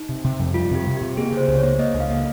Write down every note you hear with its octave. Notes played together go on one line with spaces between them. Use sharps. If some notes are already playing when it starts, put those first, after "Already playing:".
Already playing: D#4
C3
C3
F2
G3 F4
C3 G4
C3
C3 G4
A#3 G#4
C#3 C5
C#2
C#5
A#3
A#3 D#5
C#2
F5
A#3